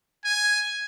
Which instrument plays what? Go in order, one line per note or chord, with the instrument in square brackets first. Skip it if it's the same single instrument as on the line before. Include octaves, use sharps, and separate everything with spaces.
[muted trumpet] G#5